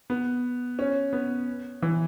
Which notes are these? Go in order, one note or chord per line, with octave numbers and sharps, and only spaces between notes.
B3
C#4
B3
E3